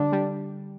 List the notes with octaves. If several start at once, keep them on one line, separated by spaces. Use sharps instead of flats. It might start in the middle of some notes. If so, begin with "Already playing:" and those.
Already playing: D3 G3 D4
G3